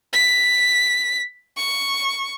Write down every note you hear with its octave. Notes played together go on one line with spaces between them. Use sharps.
B6
C#6